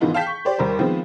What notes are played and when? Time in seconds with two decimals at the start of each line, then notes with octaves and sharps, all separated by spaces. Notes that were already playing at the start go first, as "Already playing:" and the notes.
0.01 G#2 D#3 E3 B3 D#4 F4
0.14 F5 G5 A5 G6 B6
0.26 C#6
0.45 G4 C5 D5
0.58 D#2 G3 A#4 C5
0.79 D#3 F3 G#3 B3 C4